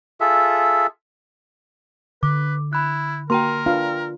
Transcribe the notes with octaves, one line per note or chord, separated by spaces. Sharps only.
F4 G#4 A4 E5
D3 B4 D6
E4 B5 F#6
A#3 F#4 A#4 G5 A#5 C6
D4 F4 B4 F5